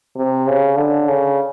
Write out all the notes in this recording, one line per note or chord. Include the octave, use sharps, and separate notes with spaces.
C3
C#3
D3
C#3